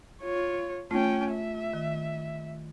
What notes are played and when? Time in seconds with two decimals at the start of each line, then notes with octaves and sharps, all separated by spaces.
0.22 F4 C#5
0.91 A3 C#4 F4 G5
1.31 E5
1.73 D#3